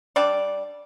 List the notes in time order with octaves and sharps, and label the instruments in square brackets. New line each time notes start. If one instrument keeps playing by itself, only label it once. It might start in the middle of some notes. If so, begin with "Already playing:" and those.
[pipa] G3 D4 D5